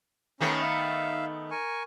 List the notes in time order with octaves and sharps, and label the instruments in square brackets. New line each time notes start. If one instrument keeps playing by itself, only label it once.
[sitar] D#3 A3 B3 [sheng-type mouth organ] C#4 A#5
[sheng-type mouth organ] E5 F5
A#4 G#5 C#6